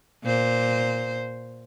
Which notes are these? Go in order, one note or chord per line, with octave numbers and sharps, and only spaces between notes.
A#2 C5